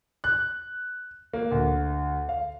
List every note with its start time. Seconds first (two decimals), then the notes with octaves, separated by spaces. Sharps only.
0.24 F#6
1.33 A#3
1.51 D2
2.29 F5